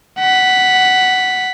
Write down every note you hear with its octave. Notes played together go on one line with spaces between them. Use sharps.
F#5 B6